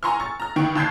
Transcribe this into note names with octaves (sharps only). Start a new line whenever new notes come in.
G#5 A#5 C6 C#6 E6 F6
C#6 A6
A#5 F6
G2 D#3 G5 C#6 D7
D#2 A5 G6 G#6 C7